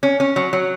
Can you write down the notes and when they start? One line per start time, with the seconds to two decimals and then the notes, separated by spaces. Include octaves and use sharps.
0.03 C#4
0.20 C#4
0.36 F#3
0.53 F#3